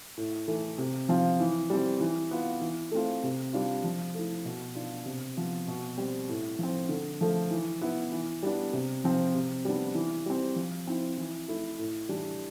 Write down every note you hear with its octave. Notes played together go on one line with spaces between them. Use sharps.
A2
E3 A3
C3
F3 C4 F4
E3
G3 C4
E3
B3 F4
E3
A3 C4 F4
C3
G3 D4 F4
F3
A3 E4
B2
B3 D4 F4
C3
F3 B3 F4
B2
G3 C4
A2
F3 C4
D3
F3 A3
E3
B3 E4
E3
G3 B3 D4
C3
F3 C4
C3
G3 B3 D4
E3
G3 C4
F3
C4 E4
E3
A3 E4
A2
E3 G3 D4